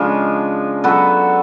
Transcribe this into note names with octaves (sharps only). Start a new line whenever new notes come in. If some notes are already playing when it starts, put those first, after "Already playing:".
Already playing: C#3 F3 G#3 D4
F#3 B3 F#4 A4